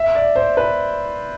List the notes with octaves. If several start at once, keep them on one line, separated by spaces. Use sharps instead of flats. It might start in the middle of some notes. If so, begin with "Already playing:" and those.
Already playing: E5
D5
C5
B4